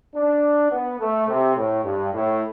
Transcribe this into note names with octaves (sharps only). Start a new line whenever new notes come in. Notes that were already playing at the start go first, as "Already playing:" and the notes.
D4
B3
A3
C3
A2
G2
A2